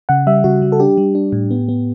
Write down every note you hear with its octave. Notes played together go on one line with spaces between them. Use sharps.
C#3 F#5
G3 E5
C#3 F#4
G3
A4
D4 G4
G3
D4
A2
B3
B3